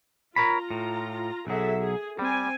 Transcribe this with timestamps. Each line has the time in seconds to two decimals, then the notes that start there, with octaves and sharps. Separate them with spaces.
0.36 F4 A#4 C#5 A#5 B5
0.70 A2
1.47 B1 F#3 G#4 A4 E5
1.80 G#4
2.19 G3 C4 G#5